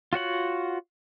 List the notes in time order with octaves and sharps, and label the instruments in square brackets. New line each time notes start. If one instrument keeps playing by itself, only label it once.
[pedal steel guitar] F4 F#4 C#5 F#5